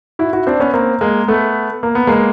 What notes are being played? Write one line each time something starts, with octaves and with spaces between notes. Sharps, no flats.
E4 F#4
E4 F#4
C4 D4
B3 C#4
A#3 C4
G#3 A#3
A3 B3
A#3
B3
G#3 A#3